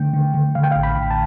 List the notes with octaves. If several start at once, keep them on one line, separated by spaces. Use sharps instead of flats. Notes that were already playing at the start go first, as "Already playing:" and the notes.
Already playing: D3 A3 G5
D3
D3
D3 F5
G5
F5
A1
B5
A1
A5